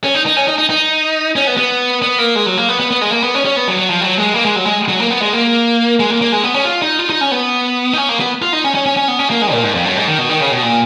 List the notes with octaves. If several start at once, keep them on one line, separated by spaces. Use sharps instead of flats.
C#4
D#4
D#4
C#4
D#4
D#4
D#4
C#4
B3
B3
B3
A#3
G#3
F#3
A#3
B3
B3
B3
G#3
A#3
B3
C#4
C#4
B3
F#3
F#3
F3
F#3
G#3
A#3
G#3
F#3
G#3
F#3
A#3
B3
G#3
A#3
G#3
A#3
A#3
G#3
B3
C#4
F4
D#4
F4
D#4
C#4
B3
D#4
C#4
A#3
B3
F4
D#4
C#4
C#4
C#4
C#4
B3
C#4
A#3
G#3
A#2
G#2
F2
F#2
G#2
D#3
B2
D#3
C#3
B2
A#2